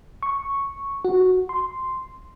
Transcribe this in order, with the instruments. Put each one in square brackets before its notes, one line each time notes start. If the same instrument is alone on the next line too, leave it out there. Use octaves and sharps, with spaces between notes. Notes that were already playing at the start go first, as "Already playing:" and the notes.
[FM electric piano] C#6
F#4
C6